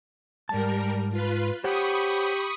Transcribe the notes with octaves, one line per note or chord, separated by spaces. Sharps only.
G#2 G3 A#4 A5
F4 B4
G4 C5 C#5 F#5 B5 C#6 D#6